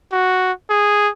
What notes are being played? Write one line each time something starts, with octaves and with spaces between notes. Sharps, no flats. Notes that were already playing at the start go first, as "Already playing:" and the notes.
F#4
G#4